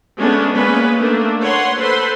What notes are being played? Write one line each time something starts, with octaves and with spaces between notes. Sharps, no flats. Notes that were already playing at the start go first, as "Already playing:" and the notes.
G#3 A3 B3 C#4 D4
G#3 A#3 B3 C#4 B4
A3 A#3 D4
B4 C#5 F#5 C6
A4 B4 C5 C6